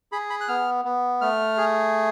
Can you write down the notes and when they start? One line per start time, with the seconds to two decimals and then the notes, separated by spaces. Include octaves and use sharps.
0.12 G#4 B5
0.30 B5
0.41 F#6
0.48 B3 F6
0.85 B3
1.21 A3 F6
1.57 G#4